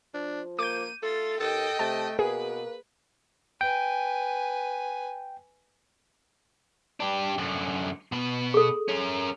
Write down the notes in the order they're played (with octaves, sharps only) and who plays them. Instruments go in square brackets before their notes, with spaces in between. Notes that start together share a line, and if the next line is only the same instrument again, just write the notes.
[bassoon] F3 [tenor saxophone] D4
[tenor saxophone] A#3 [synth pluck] D6 G6 [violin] D#7
[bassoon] A3 [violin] F4 A6 [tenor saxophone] A4
[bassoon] D#2 [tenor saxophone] A4 [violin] D#5 G5
[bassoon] C3 [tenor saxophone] A3 [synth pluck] A5
[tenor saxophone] B2 [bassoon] A#3 [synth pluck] G#4 [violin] B4
[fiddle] B4 G#5 [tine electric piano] G5
[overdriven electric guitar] D4 G4
F#2 D3
B2 B4
[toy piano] G#4 A4
[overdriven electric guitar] C#4 A#4